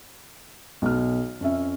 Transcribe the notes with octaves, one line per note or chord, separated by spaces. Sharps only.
B1 F6
F2 C#4 E5